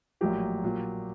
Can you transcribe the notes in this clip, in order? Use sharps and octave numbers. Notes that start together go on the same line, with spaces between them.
A#1 A2 F#3 A#3 G4
A#2 F#3